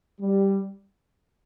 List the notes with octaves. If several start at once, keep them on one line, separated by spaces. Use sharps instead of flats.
G3